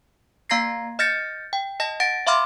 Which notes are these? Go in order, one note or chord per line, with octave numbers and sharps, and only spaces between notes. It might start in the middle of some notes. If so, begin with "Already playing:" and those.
A#3 F5 A#5 G#6 A#6 C7
D#5 F6 G6 A6 A#6 C#7
G5
D#5 A5 A#6
F#5 A6 A#6 D7
E5 F5 B5 C6 D6 F6